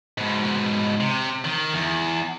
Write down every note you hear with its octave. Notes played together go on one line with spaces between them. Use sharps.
G#2 B2
C3
D#3
E2